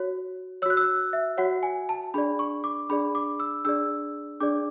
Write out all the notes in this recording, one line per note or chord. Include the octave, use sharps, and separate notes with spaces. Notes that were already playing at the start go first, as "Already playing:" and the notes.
Already playing: F#4 C#5
F#4 C#5 E6 F#6
E6
E5
F#4 C#5 F#5
G#5
A5
D4 G#4 D5 B5
C#6
D6
D4 G#4 D5 B5
D6
E6
D4 G#4 D5 E6
D4 G#4 D5 D6